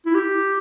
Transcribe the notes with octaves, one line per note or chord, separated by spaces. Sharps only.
E4
G4